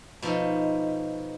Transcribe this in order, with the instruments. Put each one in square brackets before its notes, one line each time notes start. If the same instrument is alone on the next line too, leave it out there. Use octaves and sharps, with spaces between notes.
[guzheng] B2 F3 D#4 A4